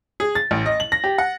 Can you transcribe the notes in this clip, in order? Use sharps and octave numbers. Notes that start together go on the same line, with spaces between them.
G#4
A6
A1
D#5
F#7
A#6
G4
F#5